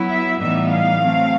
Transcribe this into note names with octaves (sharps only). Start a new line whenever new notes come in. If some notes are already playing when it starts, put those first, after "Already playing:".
Already playing: F#3 B3 E4
E5
A2 E3 G3 B3 D#4 E5
F5
F#3 A3 C4